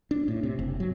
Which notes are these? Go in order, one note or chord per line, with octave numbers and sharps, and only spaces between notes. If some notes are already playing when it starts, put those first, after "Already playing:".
D4
A2
C3
F#1
F#3